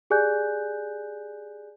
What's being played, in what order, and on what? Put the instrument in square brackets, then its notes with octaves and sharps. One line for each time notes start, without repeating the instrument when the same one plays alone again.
[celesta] G4 G#4 D5 G#5 F#6 G6